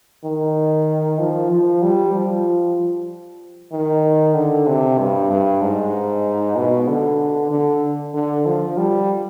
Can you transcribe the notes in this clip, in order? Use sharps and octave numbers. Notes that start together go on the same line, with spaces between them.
D#3
F3
F3
G3
F3
D#3
D3
C3
G2
G2
G#2
B2
D3
D3
D3
F3
G3